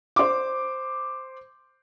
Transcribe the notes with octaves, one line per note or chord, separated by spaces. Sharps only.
C5 D6